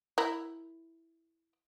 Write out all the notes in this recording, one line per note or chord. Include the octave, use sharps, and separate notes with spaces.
E4 A#4